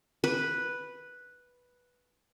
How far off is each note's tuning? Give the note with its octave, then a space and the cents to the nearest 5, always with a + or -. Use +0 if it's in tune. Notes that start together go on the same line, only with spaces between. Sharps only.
B4 -5